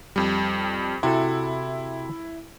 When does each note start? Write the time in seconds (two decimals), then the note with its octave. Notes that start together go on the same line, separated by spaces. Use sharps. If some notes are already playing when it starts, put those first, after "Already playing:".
0.16 F2 G3
1.03 C3 E4 F#4 A4